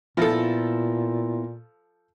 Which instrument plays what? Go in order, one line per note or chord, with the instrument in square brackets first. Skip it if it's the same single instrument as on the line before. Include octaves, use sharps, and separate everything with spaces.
[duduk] A#2 [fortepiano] F3 A4 [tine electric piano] B3 E4 A#6